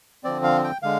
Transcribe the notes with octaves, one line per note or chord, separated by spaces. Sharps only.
D3 F3 C4 D5
F5
G5
D3 G#3 F5